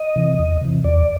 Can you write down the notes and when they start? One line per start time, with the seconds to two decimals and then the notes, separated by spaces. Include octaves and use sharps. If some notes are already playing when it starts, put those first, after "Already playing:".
Already playing: D#5
0.16 C3 E3
0.39 E2
0.61 C3 E3
0.84 E2 D5